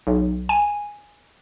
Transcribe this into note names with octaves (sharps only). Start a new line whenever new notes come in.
B1
G#5